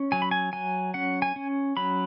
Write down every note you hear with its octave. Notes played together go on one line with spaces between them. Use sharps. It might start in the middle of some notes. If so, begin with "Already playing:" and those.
Already playing: C#4
F#3 G#5
B5
G#5
F#3 G#5
C#4 F#5
G#5
C#4
F#3 B5